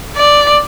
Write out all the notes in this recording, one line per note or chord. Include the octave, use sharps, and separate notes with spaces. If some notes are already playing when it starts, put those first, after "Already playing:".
D5